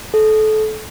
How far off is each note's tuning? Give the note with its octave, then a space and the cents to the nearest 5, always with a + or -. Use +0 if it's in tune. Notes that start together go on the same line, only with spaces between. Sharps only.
A4 -25